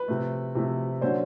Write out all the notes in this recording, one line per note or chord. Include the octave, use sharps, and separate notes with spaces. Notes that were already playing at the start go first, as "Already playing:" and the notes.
Already playing: B4
C3 F3 A3
C3 F3 A3
D3 F#3 A#3 C#4 C5